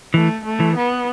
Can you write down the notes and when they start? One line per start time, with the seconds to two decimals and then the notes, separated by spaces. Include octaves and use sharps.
0.14 E3 A3
0.45 A3
0.60 E3
0.75 B3